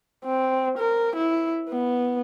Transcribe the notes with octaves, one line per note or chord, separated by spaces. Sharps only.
C4
A#4
E4
B3